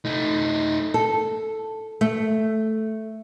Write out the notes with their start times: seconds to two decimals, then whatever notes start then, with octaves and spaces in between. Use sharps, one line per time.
0.05 A3 D#4
0.94 A4
2.01 A3